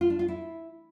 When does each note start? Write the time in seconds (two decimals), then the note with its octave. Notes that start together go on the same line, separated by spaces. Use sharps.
0.01 F4
0.10 D4
0.19 F4
0.28 E4